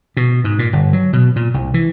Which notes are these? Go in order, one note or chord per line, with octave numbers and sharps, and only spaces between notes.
B2
G#2
A#2
G1
F#3
B2
A#2
C2
E3